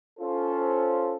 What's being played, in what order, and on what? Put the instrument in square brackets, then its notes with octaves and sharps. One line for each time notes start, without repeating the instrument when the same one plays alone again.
[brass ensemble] C#4 F4 A4 C5